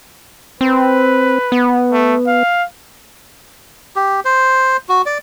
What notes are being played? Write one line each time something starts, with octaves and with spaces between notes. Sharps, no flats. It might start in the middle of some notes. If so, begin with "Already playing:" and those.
C4 B4
B3
A3
F5
G4
C5
F#4
D5